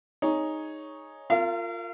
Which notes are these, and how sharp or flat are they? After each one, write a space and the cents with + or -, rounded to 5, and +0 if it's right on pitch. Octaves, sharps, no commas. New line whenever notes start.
D#4 +0 G#4 +0 C#5 +0
F4 +0 A#4 -30 F5 -45